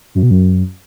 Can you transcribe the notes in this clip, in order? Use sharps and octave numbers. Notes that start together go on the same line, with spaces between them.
F#2
B2
F#2